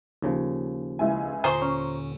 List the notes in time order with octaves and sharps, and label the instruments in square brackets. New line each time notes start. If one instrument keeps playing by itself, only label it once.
[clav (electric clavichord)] D#2 C#3 F3
[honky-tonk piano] C#2 E4 G#5
[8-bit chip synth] D#2 A#2 D3 [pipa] F4 G#4 C5 [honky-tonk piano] A#5 C#6
[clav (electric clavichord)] C#4